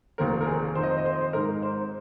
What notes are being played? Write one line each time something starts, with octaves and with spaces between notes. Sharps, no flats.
F1 D#2 D#3 C4 A#4
A#4
G#4
F2 D#3 C4 C5
D#5
C5
D#5
C5
D#5
C5
G#2 G#3 C4 D#4 A#4
C5